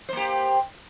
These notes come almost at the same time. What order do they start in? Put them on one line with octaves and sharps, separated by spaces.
C5 A#3 G4